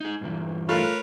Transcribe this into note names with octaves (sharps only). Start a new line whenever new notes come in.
D#4 G#4
G2 A#2 E3
A3 F4 A#4 B4 C#5